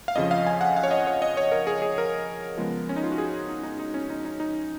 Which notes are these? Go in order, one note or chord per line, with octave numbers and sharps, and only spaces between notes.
F5
F2 C#3 F3 D#5
F5
G#5
F#5
F5
C#5
D#5
C#5
D#5
C#5
A#4
G#4
G#4
A#4
C#3 F3 G#3 B3
C#4
D#4
F4
F#4
G#4
D#4
D#4
D#4
C#4
D#4
D#4
D#4